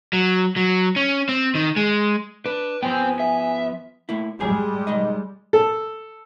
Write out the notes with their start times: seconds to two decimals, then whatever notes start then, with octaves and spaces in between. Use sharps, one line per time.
0.13 F#3
0.56 F#3
0.96 C#4
1.29 C4
1.55 D#3
1.77 G#3
2.46 D4 B4
2.83 F3 B3 C5 G5 G#5
3.20 E5
4.09 A3 A#3 E4
4.40 G3 G#3 G4 G#4 G#5
4.87 B1 D#3 D#5
5.53 A4